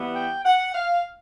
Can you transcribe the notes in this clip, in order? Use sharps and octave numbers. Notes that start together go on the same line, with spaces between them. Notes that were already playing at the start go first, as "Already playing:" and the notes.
Already playing: E3 G3 B3
G5
F#5
F5